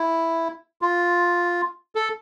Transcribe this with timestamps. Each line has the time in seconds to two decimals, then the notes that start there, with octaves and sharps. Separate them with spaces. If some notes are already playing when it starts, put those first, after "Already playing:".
Already playing: E4
0.82 F4
1.95 A4